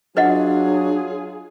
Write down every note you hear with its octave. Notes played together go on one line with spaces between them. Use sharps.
F#3 D4 F4 G#4 B4 D#5 F#5